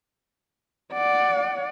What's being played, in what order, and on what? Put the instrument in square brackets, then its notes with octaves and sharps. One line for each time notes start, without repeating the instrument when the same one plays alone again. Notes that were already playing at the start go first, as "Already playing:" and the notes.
[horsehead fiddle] D5 F#5